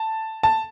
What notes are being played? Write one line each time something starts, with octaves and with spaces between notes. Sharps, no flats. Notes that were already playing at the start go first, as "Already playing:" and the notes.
Already playing: A5
A5